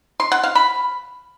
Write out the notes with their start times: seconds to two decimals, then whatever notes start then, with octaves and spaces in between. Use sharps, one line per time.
0.20 C6
0.32 F#5
0.44 F5
0.55 B5